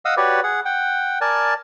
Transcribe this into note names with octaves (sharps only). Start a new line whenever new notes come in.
D#5 F5 F#5 D#6 E6
F#4 G4 B4 C#5 D5
G#4 F#5
F#5 G5
A#4 D5 G#5 A5